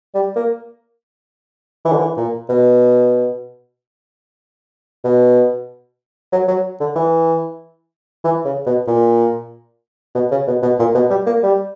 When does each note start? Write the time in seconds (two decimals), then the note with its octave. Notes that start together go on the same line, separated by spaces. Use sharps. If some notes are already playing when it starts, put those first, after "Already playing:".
0.14 G3
0.36 A#3
1.85 E3
1.92 D3
1.99 E3
2.17 A#2
2.49 B2
5.04 B2
6.32 F#3
6.48 F#3
6.80 D3
6.96 E3
8.24 E3
8.45 C#3
8.66 B2
8.88 A#2
10.15 B2
10.31 C#3
10.47 B2
10.62 B2
10.79 A#2
10.95 B2
11.10 G3
11.26 A#3
11.43 G3